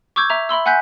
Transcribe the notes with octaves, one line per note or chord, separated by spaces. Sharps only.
C#6 D6 E6 G6 G#6
E5 A#5
E5 B5 C6 E6
F#5 G#5 F#6 G6 B6